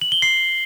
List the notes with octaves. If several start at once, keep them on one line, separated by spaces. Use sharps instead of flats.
F#7
G7
C7